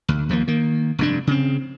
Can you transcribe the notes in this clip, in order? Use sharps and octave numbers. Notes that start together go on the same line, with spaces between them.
D2
D#2 F3 A3 A#3
D#3 A#3
F1 G2 D4
C#3 C4